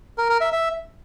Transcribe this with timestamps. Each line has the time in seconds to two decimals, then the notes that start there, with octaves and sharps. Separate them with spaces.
0.18 A#4
0.29 A#4
0.41 E5
0.52 E5